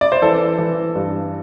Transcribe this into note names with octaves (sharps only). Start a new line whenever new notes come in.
D5
C5
E3 A4
E3
G2